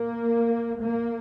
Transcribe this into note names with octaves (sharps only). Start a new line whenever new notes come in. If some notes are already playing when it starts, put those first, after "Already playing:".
Already playing: A#3
A#3